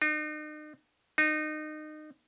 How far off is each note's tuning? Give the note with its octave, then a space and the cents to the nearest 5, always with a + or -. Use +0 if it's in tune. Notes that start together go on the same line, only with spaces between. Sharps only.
D#4 -40
D#4 -25